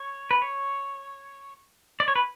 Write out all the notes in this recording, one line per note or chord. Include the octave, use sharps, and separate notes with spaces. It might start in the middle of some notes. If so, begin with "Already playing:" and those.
Already playing: C#5
B4
C#5
D5
C#5
B4